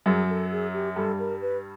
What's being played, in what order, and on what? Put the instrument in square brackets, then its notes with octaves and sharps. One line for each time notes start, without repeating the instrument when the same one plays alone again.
[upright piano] F#2 F#3 [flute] G#4
[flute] A4
G#4
G4
[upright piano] G2 G3 [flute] A4
[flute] A#4
B4